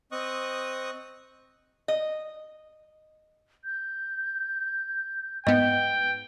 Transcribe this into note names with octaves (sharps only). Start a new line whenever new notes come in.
C4 D#5 C#6 D#6 F#6
D#5
G6
G#2 B3 D#5 G5